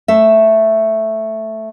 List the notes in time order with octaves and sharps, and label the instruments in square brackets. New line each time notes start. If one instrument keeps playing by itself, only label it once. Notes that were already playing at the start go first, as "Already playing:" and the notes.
[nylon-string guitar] A3 E5